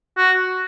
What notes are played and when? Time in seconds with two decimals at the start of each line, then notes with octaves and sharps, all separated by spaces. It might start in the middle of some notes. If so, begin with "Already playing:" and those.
0.17 F#4